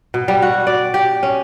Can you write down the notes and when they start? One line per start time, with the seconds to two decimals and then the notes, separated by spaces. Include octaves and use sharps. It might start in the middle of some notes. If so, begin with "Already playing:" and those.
0.14 B2
0.28 G3
0.42 F#4
0.67 D5
0.94 G4
1.23 C#4